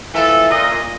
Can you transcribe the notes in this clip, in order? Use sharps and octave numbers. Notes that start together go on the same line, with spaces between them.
E3 F3 A3 A4
A#2 D#5